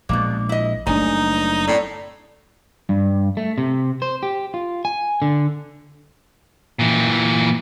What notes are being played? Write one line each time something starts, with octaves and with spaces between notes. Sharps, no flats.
A#1 B2 G#3 A#3
E4 D#5
F#1 G3 A3 D4 D#4 G#5
A2 C4 D5
G2
A3
C3
C5
G4
F4
G#5
D3
A#2 E3